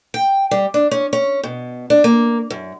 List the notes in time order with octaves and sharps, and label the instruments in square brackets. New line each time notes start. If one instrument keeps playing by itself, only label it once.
[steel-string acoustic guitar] G5
G3
D4
C#4
C#4
B2
D4
A#3
F#2